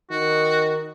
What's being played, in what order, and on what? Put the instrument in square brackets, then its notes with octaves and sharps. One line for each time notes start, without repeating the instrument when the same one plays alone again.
[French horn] D#3 [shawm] F#4